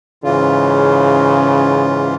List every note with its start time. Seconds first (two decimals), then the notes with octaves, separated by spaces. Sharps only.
0.24 G#2 C#3 E3 F4